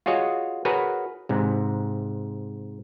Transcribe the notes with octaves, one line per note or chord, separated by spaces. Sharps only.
F4 F#4 G#4 C#5 D#5
F#4 G#4 A#4 B4 C#5
G#2 C3